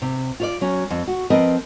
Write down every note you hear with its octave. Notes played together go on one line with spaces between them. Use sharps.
C3
F4 C#5 D5
F#3 C#4
F2
F#4
F3 C4 A#4 B4 D#5